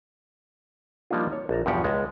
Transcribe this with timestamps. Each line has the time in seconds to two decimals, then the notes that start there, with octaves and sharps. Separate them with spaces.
1.11 F3 G3 A#3 D4 D#4 F4
1.33 C#5
1.49 A#1 A5 A#5
1.66 E2 G2 B2 F3 G4 F#5
1.84 C#2 G#3 A5